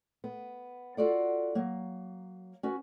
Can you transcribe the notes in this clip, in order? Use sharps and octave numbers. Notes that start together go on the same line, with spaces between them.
B3
F4 F#4 A4 D5 F5 F#5
F#3 A#3
C#4 F#4 B4